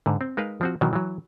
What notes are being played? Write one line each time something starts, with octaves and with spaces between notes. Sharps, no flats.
G#2 D3
C4
G#3 D#4 A#4 B4 F5
F3 C4 F#4
B2 D#3 E3 F#3
E3 F#3